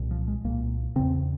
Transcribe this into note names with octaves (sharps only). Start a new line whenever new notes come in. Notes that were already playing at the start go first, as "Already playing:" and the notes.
Already playing: C2 A#2
F3
G#3
C2 A#2 A#3
E2 C#3 C4